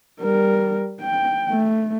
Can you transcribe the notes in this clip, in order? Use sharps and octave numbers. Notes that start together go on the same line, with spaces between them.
G3 A#4
G5
A3